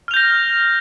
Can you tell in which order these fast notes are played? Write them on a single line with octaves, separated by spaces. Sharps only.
F6 F7 G6 A#6